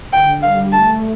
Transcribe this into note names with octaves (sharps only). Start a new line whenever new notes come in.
D3 G5
G3 F5
A3 A5